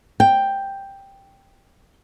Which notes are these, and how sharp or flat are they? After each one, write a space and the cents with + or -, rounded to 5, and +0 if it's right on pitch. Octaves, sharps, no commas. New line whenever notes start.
G5 +5